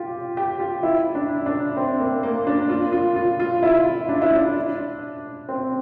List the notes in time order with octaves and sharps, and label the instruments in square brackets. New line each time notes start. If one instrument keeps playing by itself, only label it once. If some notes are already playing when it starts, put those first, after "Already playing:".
Already playing: [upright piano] F4 G4
G4
F4
E4
D4
D4
C4
A#3
A#3
D4
F4
F4
F4
F4
E4
D4
E4
D4
C4